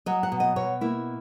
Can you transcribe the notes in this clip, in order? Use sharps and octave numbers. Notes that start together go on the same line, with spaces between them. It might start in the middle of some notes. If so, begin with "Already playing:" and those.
F#3 D#5
F#5
B2
D#5
B2 C#5
A#3 E4